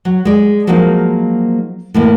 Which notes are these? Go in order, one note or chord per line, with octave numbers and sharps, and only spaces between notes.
F#3
G#3 D5
F3 F#3 G#3 A#3 D#4
A2 E3 A#3